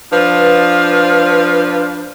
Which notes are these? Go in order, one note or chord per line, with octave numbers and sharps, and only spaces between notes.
F3 D4 F4 B4